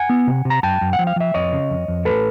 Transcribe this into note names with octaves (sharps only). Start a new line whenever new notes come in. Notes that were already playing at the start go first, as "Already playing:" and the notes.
Already playing: F#5 G#5
B3
C3
C3
A#5
F#2 G5 A5
F#2
F#5
F3
F5
F3 E5
F2 C#5 D#5
C#3
F2
F2
A2 A4 B4